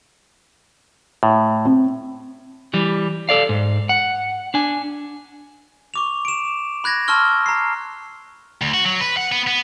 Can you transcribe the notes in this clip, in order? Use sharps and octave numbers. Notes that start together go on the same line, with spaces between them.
A2
C4
E3 G3
A4 D5 F5
G#2
F#5
D4 G#5
C#6 D6 F7
D7 E7
B5 F#6 G#6 A#6
A5 C6 C#6 E6 F6 G7
A#5 C7
D2
F#4
F#3
B4
F#5
B3
B3